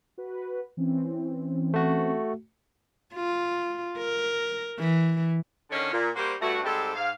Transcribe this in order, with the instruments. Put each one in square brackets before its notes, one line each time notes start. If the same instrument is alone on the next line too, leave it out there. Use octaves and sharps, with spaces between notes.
[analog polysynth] F#4 B4
E3 C4 C#4
[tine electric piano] A3 F#4
[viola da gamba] F4
A#4
E3
[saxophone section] D3 D#3 C#4
A#2
G3 A#3 F#4 C5
G2 A3 F#4
G#2 G3 G#3 C4 G4 A4
G#2 F5